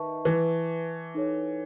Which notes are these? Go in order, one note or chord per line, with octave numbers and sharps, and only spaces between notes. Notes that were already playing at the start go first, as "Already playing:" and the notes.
Already playing: D#3 B4 E5 A5 C#6
E3
D#4 A4 C#5